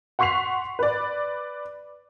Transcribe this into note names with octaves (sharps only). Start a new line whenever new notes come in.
F#5 C6 C#6 B6 C7 F7
B4 D5